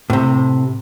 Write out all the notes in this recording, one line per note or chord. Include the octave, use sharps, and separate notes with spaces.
A2 C3